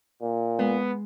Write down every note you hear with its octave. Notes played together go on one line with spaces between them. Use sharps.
A#2
G#3 B3